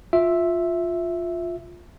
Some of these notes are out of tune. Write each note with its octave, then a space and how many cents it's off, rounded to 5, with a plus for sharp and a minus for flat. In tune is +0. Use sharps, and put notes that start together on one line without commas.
F4 +10 E5 +0